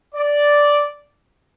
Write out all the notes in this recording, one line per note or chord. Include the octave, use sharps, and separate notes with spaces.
D5